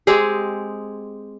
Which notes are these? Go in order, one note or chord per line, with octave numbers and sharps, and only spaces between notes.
G#3 C4 G4 G#4